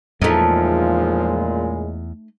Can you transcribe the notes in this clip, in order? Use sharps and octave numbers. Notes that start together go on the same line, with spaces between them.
E2 A#2 C#3 F3 G#3 A3 D#4